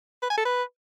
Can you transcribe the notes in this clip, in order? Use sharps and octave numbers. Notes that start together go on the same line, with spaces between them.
B4
G#5
A4
B4